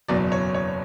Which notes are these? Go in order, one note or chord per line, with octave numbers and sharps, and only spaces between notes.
F#1 E2 B2 F#3 D5
C#5
C#5